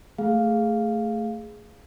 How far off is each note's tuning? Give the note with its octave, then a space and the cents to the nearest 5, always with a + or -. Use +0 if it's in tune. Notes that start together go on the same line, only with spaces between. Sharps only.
A3 +10 G#4 +0 F5 +0